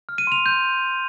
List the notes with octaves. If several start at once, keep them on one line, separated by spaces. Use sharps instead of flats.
F6
D#7
C6 F7
C6 G6